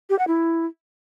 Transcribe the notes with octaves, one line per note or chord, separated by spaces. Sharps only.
G4
F#5
E4